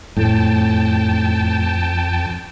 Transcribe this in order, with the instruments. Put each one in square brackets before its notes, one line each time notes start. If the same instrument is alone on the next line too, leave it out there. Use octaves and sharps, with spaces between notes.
[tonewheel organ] F2 G5 A5 [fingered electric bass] A2